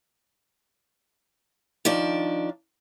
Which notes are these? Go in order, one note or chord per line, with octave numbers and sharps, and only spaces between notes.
D#3 F3 D4 D5